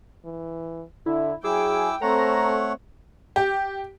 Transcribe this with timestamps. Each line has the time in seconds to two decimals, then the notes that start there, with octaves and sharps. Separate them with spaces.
0.25 E3
1.06 D3 E4
1.44 F#3 E4 G#4 G5 D6 E6
2.02 A3 C4 A4 C5 C#5 F#5 A#5
3.36 G4